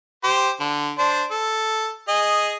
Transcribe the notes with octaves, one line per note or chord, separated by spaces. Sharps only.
G4 C5
D3
D4 C5
A4
G#4 D#5